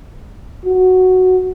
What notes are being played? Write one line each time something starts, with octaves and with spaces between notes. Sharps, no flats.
F#4